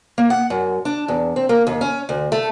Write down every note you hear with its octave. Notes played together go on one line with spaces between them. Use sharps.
A#3
F#5
F#2
D4
E2
C4
A#3
D#2
C#4
D2
A3